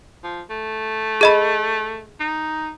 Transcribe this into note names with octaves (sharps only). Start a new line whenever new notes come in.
F3
A3
G#4 D#5 B5
D#4